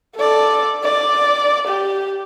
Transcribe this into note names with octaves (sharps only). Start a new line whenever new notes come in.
A4 D5
D5
G4